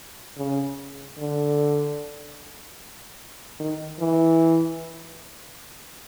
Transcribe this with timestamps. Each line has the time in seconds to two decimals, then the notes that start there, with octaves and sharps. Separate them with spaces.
0.37 C#3
1.18 D3
3.60 D#3
4.00 E3